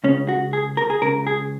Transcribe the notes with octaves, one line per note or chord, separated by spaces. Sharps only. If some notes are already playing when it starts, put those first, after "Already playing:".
C#2 C#3 C#4
F#4
G#4
A#4
G#4
C#2 C#3 A#4
G#4